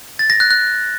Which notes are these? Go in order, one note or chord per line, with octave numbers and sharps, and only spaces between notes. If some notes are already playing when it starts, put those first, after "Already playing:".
A6
A#6
F#6
F#6